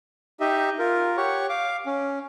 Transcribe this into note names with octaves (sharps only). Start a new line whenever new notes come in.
D#4 G4 D#5 E5
F4 A#4
G4 C#5 F#5 C#6
F5 D6
C#4